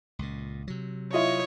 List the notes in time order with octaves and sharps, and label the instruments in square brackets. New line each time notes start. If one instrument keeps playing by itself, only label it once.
[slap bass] C#2 A#2
C3 F#3
[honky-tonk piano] E4 F4 D#5 [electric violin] C#5